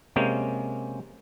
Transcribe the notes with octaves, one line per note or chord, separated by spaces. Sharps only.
C3 G#3 A#3 C#4 G5